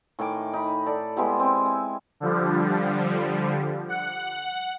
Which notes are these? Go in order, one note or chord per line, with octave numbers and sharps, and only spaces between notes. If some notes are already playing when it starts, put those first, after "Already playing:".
A2 D#3 G#5 D6
D#4 B5
A4 D5
G#3 B3 E4 G4
C4
G#5
D3 F3 G3
F#5